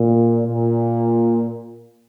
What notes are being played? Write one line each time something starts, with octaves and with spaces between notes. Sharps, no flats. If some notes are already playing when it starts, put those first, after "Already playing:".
Already playing: A#2
A#2